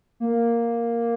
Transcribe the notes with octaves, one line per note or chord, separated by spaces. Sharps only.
A#3